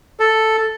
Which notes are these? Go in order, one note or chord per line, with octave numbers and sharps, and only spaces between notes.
A4